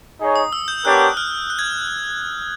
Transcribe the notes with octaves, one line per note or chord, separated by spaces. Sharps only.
D#4 G#4 C#5
D#6
E6
G6
B3 D4 G4 A#4 C#5 F#6
F6
F#6
G#6